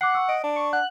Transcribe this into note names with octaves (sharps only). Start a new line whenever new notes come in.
F#5 D6 F#6 C7
C#6 E6
D#5 D7
D4
C#6
F#5 F#6